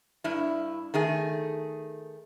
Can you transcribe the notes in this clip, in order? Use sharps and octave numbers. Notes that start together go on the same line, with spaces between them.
G2 E4
D#3 A3 G#4